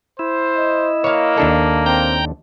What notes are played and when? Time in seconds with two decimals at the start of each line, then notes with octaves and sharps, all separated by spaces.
0.19 E4 C5
0.57 D#5
1.04 A#3 C#5 F5
1.38 D#2 D4 A4
1.86 C4 G5 A#5 G6